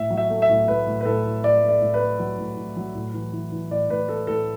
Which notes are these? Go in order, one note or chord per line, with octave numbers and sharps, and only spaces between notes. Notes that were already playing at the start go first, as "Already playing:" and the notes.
Already playing: A2 E5
F#3
E5
A3
E5
A2
A2 B4
A2
B4
A2 A4
A2
A2 D5
A3
D5
A2
B4
A3
F#3
A2
A2
F#3
A2
E3
E3
E3
A2 D5
A2 B4
A3 A4
A2 A4